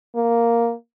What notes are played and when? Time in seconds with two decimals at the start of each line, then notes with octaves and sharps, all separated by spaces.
0.15 A#3